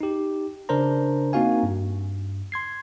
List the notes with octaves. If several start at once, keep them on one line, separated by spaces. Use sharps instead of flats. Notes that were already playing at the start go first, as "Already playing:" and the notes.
D#4 G4
C#3 D4 A#4 C5 A#5
A#3 C4 D#4 F#4 F5 G#5
G2
C6 G#6 C7